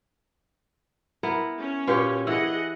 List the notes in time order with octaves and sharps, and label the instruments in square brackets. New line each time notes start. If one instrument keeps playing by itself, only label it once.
[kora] B3 E4 A#4
[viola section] C#4
[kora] A#2 G4 C#5 [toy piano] F#4 B4
[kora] E3 [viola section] G#4 D#5 F#5 [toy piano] E6